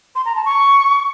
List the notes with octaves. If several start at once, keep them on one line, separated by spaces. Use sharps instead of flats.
C6
A#5
A5
C#6